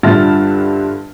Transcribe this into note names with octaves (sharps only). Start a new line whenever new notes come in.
G2 D3 F4 E5 F6 A6